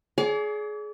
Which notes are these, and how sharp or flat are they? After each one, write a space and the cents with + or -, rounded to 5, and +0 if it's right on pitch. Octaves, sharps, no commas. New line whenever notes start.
G#4 +25 D5 -40 D6 -30